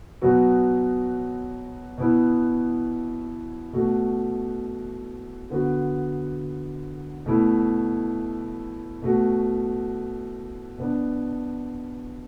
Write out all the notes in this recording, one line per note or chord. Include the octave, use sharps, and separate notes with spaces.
B2 F#3 B3 F#4
B2 B3 E4
B2 A3 F#4
D3 B3 F#4
B2 A3 E4
B2 A3 F#4
B2 B3 D4